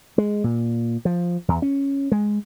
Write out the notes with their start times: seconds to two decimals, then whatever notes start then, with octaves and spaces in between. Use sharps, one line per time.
0.18 G#3
0.44 A#2
1.05 F3
1.48 E2
1.62 C#4
2.12 G#3